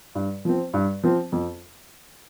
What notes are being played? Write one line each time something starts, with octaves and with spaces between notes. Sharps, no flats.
G2
F3 C4
G2
F3 C4
F2